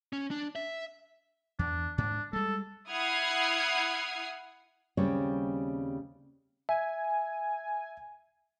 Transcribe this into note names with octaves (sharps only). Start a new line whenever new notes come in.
C#4
D4
E5
E2 D4
G#2 D4
G3 G#3 A4
E4 F#5 D#6 F6 G#6 C7
D#2 C#3 G3 C4 C#5
E5 G#5